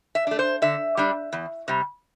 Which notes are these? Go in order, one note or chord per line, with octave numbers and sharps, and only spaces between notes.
E5
A3 D4
C5
D3 E5
G3 D4
E2
C3 G3